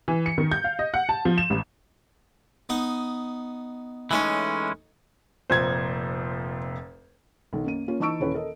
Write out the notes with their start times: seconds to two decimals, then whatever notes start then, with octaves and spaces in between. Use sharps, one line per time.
0.08 E3
0.26 C#7
0.38 D#3
0.51 G6
0.64 F5
0.79 D#5
0.94 F#5
1.09 A5
1.25 F3
1.38 E7
1.50 A1
2.69 B3 D#4 D#6
4.11 E3 G#3 A3 C#4 D#4 C#5
5.50 F1 F2 A#2 C5 G#6
7.53 B1 D#3
7.64 F#2 A#3 D#7
7.88 A#3 C#4 F4
8.00 E3 D#4 A5 C#6 E6 D7
8.20 D#1 C#4 E4 B4
8.34 A4 A#4 D#5